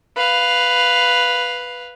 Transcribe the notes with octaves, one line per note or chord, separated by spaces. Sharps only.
B4 F5